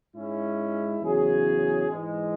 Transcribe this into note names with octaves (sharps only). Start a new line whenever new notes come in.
G#2 G#3 C#4 E4
E2 C#3 F#3 C#4 G#4
G#2 E3 G#3